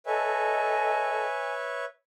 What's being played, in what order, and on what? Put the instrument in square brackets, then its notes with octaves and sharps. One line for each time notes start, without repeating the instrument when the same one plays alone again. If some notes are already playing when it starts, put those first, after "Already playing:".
[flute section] A4 D#5 [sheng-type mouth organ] B4 C#5 E5 [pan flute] G#5